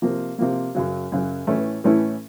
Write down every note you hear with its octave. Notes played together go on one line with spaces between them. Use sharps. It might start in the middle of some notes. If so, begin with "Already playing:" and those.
C3 F3 A#3
C3 F3 A#3
F#2 C#3 F#3
F#2 C#3 F#3
A2 E3 A3 C#4 E4
A2 E3 A3 C#4 E4